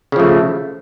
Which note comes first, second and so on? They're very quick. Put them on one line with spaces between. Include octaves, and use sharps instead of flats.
C#3 F3 A3